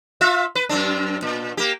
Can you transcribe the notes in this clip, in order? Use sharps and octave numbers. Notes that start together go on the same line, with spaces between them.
F4 E5
B4
F#2 C4 D4
A#2
A#3 G4